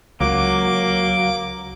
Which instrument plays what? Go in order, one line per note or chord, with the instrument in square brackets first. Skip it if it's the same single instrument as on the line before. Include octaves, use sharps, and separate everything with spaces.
[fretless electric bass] C#2 [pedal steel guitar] F#3 [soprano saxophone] A#3 [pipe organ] D6